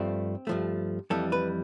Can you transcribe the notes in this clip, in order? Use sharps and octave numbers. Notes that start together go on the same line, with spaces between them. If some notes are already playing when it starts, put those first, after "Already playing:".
Already playing: G2 F3 A3 C4
G2 F3 A3
F2 E3 G3 A4
B4